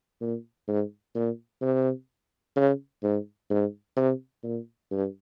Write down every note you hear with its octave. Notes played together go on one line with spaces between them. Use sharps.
A#2
G#2
A#2
C3
C#3
G#2
G#2
C3
A#2
G2